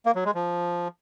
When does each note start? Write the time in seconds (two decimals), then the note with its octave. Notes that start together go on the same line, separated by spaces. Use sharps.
0.06 A#3
0.15 F#3
0.25 G#3
0.35 F3